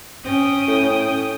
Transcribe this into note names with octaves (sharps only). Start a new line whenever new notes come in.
C#4 G5 D#6
A2